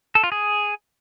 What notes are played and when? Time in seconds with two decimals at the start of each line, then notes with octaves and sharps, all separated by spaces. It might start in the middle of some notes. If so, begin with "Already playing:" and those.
0.15 A4
0.24 F4
0.32 G#4